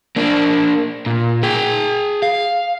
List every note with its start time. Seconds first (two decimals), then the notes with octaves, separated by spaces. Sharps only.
0.16 A#3 D4
1.06 A#2
1.43 G#4 G5
2.22 F5